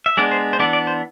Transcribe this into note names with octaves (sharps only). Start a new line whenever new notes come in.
E5
G#3 B3 D4 D5
C5
C5
E3 B3 D4 D5
D5
C5